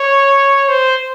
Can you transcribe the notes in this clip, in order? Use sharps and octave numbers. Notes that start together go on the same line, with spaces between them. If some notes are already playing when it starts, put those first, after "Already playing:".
Already playing: C#5
C5